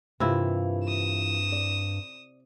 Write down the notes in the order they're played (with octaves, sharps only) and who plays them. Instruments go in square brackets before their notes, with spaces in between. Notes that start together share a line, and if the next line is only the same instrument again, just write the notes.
[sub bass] G2 [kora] C3 E4 [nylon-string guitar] E3 A#3 F4
[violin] D#6 E7
[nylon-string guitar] D5